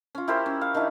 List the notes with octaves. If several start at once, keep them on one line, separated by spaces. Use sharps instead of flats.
C#4 F4
E4 G4 A#4 C5
C#4
F5
D#3 D4 E4